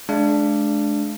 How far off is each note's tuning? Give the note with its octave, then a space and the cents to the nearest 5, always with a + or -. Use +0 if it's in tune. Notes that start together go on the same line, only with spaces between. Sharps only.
G#3 +40 D4 +0 F5 -35